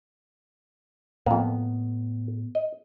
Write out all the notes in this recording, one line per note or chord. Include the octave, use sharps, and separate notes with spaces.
F2 A2 A#3 B3
D#5